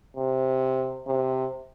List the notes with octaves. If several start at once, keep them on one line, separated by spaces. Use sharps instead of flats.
C3
C3